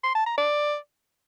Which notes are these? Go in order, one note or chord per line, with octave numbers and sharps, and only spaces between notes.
C6
A5
A#5
D5